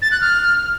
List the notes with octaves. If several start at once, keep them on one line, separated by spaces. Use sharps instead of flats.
A6
F#6
F6